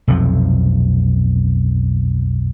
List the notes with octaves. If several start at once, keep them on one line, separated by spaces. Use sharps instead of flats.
B1 F2 C3 F3